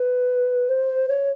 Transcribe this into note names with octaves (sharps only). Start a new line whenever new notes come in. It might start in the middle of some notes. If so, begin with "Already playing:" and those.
Already playing: B4
C5
C#5